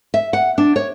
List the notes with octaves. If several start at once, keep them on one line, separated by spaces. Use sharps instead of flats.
E5
F#5
D4
C#5